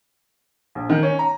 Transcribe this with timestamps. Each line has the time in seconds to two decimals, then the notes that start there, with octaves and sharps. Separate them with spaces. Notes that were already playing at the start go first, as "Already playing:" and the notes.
0.75 A#1
0.90 D#3
1.03 C#4
1.19 A#5